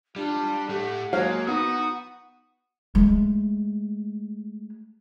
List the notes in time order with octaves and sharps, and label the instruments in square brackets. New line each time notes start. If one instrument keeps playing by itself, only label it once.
[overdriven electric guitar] G3 [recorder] D4 [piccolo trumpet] F4
[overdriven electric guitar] A2 A3 [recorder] G4 [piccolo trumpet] F#5
[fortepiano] F#3 F5 [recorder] G#3 [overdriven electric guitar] A#3
[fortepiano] B3 [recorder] D#4 [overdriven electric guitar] F#4 [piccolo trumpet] D#6
[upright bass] G#3 A3